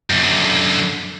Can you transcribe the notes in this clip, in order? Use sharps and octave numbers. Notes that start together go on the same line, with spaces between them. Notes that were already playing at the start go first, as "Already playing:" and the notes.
F#2 D3